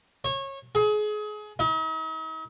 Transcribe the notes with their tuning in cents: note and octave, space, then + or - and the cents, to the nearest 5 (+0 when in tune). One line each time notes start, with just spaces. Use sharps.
C#5 -25
G#4 +30
D#4 +45